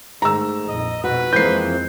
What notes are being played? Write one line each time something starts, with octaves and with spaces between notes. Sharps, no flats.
G#2 D#3 A3 A#5 E6
A#1 F2 D#5
F2 G#2 B2 F#4 B4
F2 E3 F3 G#3 A#3 C4 G6 C7